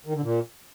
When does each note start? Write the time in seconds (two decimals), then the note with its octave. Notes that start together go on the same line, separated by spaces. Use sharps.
0.06 D#3
0.15 D3
0.23 A#2